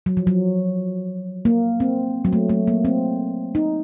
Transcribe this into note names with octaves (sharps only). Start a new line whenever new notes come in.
F#3
F3
F#3
A#3
C4
F#3
A3
A3
A#3
C4
D#4